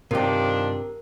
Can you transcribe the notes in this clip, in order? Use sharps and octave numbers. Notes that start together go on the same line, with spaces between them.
G2 C3 D#3 F3 D4 G4 A#4